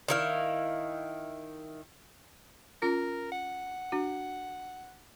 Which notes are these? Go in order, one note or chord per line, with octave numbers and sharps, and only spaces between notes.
D#3 E4 F5
C#4 F4 A#4
F#5
D4 F#4